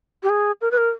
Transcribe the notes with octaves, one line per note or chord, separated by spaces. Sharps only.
G4
G#4
A#4
B4
A#4